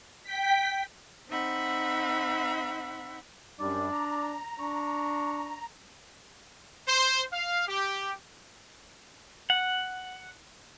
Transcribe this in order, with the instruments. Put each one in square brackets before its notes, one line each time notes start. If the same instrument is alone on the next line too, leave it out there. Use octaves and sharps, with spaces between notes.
[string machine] G5 B6
[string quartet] C4 D#4 E5 F#5 B5
[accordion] F#2 G3 [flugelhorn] D4 [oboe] D5
[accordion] A#5
[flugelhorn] D4 [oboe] C#6
[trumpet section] C5
F5
G4
[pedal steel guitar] F#5